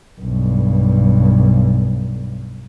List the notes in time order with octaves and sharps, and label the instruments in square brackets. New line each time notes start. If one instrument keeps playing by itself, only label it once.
[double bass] B1 G2